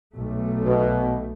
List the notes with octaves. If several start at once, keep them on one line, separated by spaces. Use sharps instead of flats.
B1 A3
B2